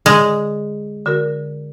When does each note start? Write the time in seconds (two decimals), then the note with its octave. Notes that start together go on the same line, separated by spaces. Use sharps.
0.06 D3 G#3
1.06 D3 F#4 A#4